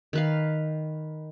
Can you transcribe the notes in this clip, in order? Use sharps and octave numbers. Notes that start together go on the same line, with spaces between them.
D#3 B4 F5